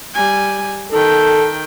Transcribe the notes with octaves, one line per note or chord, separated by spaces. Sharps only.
G3 G#5
D#3 A4 G5